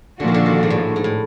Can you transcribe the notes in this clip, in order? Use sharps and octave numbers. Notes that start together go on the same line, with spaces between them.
A#2 D3 F3 A#3 D4 F#4
D#3
D3
D#3
G#2
A2
G#2
A2